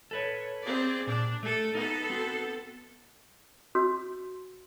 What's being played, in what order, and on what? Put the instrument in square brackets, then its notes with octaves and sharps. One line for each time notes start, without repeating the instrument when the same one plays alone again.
[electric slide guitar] A4 B4 C#5
[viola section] C4 G#4 D5
[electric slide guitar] A#2 [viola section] D4
[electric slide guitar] A3 [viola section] A4
[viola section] B3 A4 [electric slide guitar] D#4
[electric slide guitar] C4 F#4
[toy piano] F#4